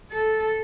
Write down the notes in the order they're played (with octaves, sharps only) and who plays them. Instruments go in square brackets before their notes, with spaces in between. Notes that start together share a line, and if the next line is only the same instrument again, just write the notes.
[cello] A4